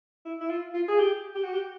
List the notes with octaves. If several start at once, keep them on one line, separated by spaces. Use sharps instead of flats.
E4
E4
F4
F4
G#4
G4
G4
F#4
G4